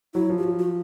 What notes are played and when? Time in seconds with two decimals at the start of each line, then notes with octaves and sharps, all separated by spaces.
0.14 F#3 E4
0.30 F3
0.38 G4
0.44 F#4
0.59 F#4